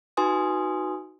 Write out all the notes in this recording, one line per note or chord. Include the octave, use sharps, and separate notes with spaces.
D#4 F#4 B4 G#5 C6 D#6